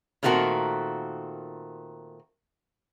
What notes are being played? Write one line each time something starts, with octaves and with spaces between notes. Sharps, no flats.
A#2 D#3 A3 C4 F#4 A#4